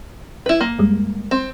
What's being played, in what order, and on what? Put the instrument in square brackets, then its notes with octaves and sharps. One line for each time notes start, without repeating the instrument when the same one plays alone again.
[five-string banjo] E4 B4
A#3
[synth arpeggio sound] F#2 G3 G#3
[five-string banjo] C4